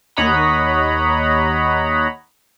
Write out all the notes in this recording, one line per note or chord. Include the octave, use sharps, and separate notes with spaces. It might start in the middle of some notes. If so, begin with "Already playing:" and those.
D#2 C#5 D#5 F#5 A#5 B5